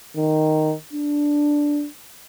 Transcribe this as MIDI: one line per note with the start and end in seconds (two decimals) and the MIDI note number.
0.16 0.73 51
0.93 1.86 62